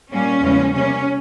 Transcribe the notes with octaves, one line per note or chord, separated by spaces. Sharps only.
A#2 G3 A#3 C#4
E2 C#3 F3 G#3
C3 G3 A#3 C#4